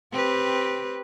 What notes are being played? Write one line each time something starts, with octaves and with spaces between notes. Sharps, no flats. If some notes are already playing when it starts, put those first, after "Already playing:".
C4 G4 B4